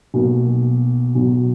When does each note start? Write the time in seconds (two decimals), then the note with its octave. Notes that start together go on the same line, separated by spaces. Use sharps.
0.14 B1 B2 A#3
1.15 B1 B2 F#3